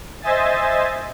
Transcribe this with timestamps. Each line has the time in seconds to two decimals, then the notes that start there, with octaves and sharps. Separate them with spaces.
0.22 C5 D#5 E5 G#5 A6